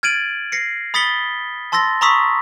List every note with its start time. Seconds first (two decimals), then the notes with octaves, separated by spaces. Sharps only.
0.03 F6 G#6 A6 D7 D#7 F#7
0.52 A#6 C7 C#7
0.94 B5 D#6 A6 B6 C#7 G7
1.72 A5 C6 E6 A6 A#6
2.01 A#5 B5 C#6 D#6 E6 B6